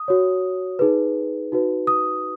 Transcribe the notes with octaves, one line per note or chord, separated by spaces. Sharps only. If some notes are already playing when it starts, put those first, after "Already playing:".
Already playing: D#6
F#4 C#5
D#4 G#4 B4
D#4 F#4 B4
D#6